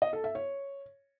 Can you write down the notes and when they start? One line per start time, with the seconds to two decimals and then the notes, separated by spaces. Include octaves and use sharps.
0.02 D#5
0.13 A4
0.24 E5
0.35 C#5